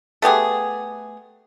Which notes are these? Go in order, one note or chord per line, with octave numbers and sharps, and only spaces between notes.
A3 B3 G4 G#4